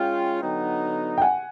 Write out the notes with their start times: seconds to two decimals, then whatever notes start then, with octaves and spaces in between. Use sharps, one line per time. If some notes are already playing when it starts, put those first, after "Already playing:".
Already playing: G#3 C#4 F4 G5
0.41 D3 F#3 B3 D#4
1.18 G5
1.22 F#5 G#5